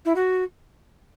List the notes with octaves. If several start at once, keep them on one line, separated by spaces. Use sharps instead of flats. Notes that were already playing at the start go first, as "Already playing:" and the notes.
E4
F#4